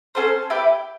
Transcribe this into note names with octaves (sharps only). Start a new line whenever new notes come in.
C#4 F4 A4 C5
E4 G4 B4